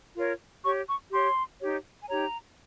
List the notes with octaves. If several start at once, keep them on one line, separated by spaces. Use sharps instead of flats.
F4 A#4 C#5
G4 C#5 C#6
C#6
G4 C#5 C6
D#4 G4 C#5
G#5
D#4 G4 C#5 A#5